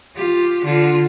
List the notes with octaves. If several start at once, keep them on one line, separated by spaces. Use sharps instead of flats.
F4 G4
D3 F4